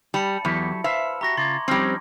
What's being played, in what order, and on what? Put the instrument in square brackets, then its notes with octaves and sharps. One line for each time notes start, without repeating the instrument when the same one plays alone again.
[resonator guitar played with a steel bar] G3 [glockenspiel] A5 B5 C#7
[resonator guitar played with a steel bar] E2 [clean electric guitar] F#3 G4 A4
[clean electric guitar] B4 C5 F5 [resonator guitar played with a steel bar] E5 [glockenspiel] B5
[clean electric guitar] F#4 G4 [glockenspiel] A#5 C#6 A#6
[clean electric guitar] C#3 F4 [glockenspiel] C6 D6 G#6
[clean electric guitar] F3 C#4 D#4 [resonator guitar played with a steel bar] G3 C4